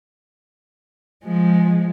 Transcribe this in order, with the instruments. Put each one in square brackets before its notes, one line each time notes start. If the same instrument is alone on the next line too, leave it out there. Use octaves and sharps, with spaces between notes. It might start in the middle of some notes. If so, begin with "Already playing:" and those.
[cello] F3 G#3